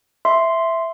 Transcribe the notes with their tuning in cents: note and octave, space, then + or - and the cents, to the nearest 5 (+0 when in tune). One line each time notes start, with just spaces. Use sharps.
E5 +0 C6 -5